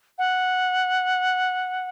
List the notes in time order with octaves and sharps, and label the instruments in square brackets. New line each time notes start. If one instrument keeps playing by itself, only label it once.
[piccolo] F#5